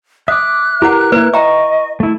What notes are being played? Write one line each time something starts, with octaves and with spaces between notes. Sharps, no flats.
E5 D6 D#6 F#6
E4 G4 A#4 B4 F#5
A#3 E4 B4
D#5 E5 G5 A#5 C#6
A3 E4